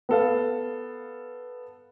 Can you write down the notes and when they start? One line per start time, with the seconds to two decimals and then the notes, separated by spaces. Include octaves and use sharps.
0.09 B3 A4 F5